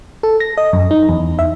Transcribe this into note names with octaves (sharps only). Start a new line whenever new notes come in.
A4
A#6
D#5
F#2
D#4
E2
E5